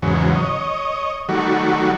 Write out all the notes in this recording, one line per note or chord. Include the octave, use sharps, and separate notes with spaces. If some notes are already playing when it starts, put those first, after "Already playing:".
E2 G#2 C#3 F#3
C#5 D#5
D#3 F#3 G3 A3 F#4